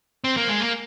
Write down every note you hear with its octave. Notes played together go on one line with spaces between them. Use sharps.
C4
A#3
G#3
A#3